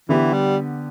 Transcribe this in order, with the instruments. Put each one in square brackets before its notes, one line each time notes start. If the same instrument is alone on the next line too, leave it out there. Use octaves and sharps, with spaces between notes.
[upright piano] D3 B3 G4 [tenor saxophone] E3
[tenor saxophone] G3